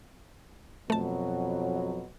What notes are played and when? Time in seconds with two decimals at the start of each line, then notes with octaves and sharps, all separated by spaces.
0.90 F2 B2 F#3 A3 A5